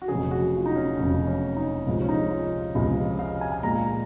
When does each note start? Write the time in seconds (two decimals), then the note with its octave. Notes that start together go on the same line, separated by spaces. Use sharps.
0.02 F#4
0.08 F1 F2 C#3 F#3 G#4
0.31 F#4
0.57 F4
0.66 D#4
0.75 C#4
0.97 F1 F2 C#3 F#3 C#4
1.27 C#4
1.57 D#4
1.86 C#2 C3 F3 G#3
2.02 C#4
2.09 D#4
2.31 F4
2.75 C#2 C3 F3 G#3
2.97 D#5
3.19 F5
3.41 G#5
3.52 G#5
3.63 A#1 A#2 G#3 A#5